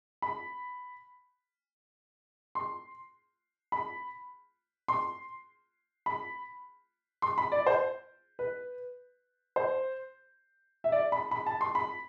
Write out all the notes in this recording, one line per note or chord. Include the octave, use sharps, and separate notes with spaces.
B5
C6
B5
C6
B5
C6
B5
D5
C5
B4
C5
E5
D5
B5
B5
A5
C6
B5